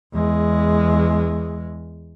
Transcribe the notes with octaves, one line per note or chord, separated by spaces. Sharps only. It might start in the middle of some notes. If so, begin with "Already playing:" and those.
E2 G#3